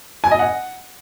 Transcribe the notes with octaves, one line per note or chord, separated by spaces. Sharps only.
G#5
D#5
F#5